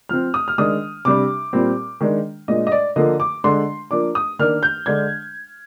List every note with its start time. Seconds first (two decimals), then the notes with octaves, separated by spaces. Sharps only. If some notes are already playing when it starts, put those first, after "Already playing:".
0.09 F3 C4 F6
0.34 D#6
0.48 F6
0.58 D#3 G#3 D4 D#6
1.05 C3 G3 D4 D6
1.53 A#2 G3 C4
2.01 D#3 G#3 D4
2.48 A#2 G#3 D4 D#5
2.67 D#5
2.72 D5
2.96 D3 F3 A#3 D#5
3.20 D6
3.44 D3 G#3 D4 C6
3.91 F3 A#3 D4 D6
4.15 D#6
4.39 D#3 A#3 D4 F6
4.63 G6
4.86 D3 G#3 D4 G#6